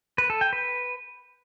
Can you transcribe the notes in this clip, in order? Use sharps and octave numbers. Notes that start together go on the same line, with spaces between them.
B4
A4
G5
B4